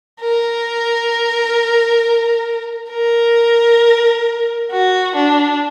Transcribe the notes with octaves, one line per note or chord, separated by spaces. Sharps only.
A#4
A#4
F#4
D4